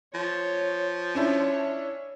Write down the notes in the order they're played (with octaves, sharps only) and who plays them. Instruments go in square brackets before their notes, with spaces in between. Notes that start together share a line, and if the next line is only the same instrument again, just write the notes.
[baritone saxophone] F3 [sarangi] C#5
[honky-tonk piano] C#4 D4 E4 [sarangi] C#5